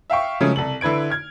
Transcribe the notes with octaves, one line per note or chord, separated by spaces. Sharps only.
E5 F5 G5 C#6
C#3 F3 F#3 G#3 A3 C#4
C2 A4 F#7
D3 E4 B4 G#6 D7
F6 G#6